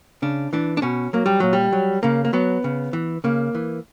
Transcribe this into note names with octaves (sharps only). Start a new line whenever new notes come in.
C#3 D4
E3 D4
D4
B2 C#4
F#3 A#3
G3
A#2 F#3
G3
F#3
C#3 A#3
A#3
F#3 B3
C#3
E3
C#3 A#3
E3